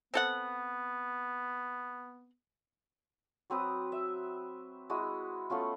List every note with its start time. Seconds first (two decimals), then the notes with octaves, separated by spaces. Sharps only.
0.14 B3 C4 A4 F#5
3.50 F#3 C4 B4 D#6
3.92 E5
4.90 G#3 E4 F#4
5.50 A3 B3 C#4 F4